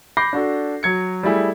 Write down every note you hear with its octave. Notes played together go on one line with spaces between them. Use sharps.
B5 D6 G6 A#6 C7
D4 F#4 A4
F#3 G#6 C#7
G3 A3 E4 G#4